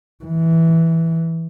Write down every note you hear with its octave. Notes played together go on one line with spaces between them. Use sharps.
E3